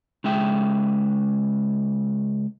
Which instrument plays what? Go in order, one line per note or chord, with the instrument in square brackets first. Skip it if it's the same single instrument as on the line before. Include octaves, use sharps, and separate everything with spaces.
[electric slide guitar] C#3 G#3 E5 G5